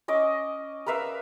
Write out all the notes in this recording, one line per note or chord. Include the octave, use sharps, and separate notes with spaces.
C#4 D#5 D6
A#4 B4 E5 F5